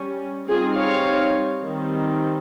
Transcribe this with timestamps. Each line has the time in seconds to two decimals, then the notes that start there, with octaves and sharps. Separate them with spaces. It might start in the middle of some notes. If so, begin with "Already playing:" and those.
Already playing: G3 C#4
0.48 G3 C4 D#4 F4 G#4
0.77 C#5 F5
1.63 D#3 G3 C4